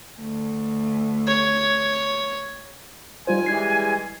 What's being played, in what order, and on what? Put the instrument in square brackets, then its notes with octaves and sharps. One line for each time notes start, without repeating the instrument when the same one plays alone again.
[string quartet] D2
[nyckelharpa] C#5
[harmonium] D#3 [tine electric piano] G3 F4 C5 [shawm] G#5
[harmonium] E3 G3 G#3 [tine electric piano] G#6 C7